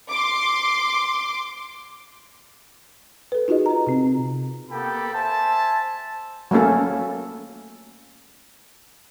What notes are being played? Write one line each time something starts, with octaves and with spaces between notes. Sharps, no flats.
C6 D6
A4 B4
D#4 F4 F#4 G#4 D#5
B4 A#5
C3 C4
A#3 B3 G4 A4 G5 B5
C5 E5 G#5 A5
F#3 A3 A#3 C#4 A4